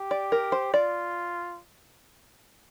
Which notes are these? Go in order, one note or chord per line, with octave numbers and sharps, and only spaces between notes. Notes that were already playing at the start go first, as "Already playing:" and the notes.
Already playing: G4
D5
A#4
C5
F4 D5